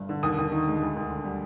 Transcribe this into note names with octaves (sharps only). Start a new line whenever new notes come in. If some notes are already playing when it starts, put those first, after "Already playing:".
Already playing: G1 G2
D3
D#2 D#6
D#2
D#3
G#3
D2
D2
D3
G3